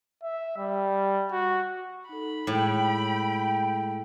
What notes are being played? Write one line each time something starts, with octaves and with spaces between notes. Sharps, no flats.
E5
G3
F#4
D#4 A4 B5
A2 G#3 G#4 G5